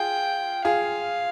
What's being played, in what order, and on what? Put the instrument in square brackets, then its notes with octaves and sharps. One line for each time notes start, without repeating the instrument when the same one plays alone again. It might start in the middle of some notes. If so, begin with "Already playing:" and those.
Already playing: [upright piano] F4 G#4 [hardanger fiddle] G5
[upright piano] F4 G#4 [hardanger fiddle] F5